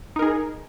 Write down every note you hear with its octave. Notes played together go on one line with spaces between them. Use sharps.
D#4 G#4 A#4